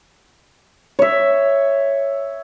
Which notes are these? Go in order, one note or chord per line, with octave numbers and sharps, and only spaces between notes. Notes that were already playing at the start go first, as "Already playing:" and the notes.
C#5 E5